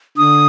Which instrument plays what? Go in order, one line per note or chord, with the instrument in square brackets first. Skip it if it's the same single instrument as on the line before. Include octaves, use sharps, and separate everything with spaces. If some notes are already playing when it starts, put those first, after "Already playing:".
[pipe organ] D3 [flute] D#6